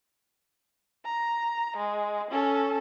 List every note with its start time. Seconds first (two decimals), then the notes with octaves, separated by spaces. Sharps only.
1.05 A#5
1.77 G#3
2.31 C#4 A4